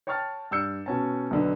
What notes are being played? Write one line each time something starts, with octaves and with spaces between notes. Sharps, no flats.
C#5 G5 A5 C#6 F6 A6
G2 D5 E6 F6 G6 C#7
B2 C#4 A5
B1 D3 B4